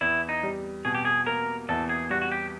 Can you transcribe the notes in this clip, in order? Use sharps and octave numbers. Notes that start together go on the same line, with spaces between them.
E2 E4
D#4
G3
B2 G#4
G4
G#4
A#3 A#4
E2 A4
G#4
G3 F#4
F#4
G4